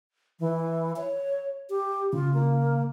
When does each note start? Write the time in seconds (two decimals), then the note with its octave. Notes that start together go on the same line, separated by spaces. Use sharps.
0.40 E3
0.96 C#5
1.70 G4
2.13 C#3 F4
2.34 A#3